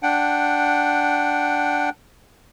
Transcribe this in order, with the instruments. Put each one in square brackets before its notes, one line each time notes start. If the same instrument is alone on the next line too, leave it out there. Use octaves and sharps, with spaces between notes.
[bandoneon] D4 F#5 G5